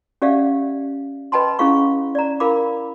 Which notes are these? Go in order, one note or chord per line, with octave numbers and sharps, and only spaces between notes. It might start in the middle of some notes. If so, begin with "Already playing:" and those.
C#4 G4 D5 E5 F5
B4 D#5 G5 A5 B5 C6
C#4 E4 G#4 F5 C#6
D5 A#5
E4 A#4 F5 B5 D6